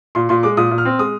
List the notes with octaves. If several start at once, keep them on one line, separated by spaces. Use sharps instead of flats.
A#2 C6
A#2 C6
G#3 D6
A#2 D#6
A#2
F6
C4
G#3 D#6